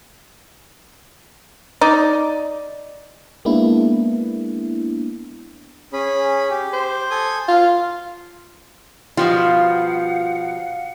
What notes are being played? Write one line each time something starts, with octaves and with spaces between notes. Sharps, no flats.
D#4 D5
G#3 A#3 B3 D4 E4
C#4 G#4 B5
G4
C5
A4 G#5 D#6
F4 F5
B2 F3 G3 F4 F5 F#5